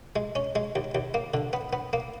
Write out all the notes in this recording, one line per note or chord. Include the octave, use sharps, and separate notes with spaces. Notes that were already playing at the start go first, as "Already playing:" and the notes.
G#3
C#4
G#3
D#2
D#2
A#3
D3
B3
B3
A#3